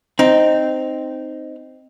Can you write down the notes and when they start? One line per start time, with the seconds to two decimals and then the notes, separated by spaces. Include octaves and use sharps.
0.19 C4 D#4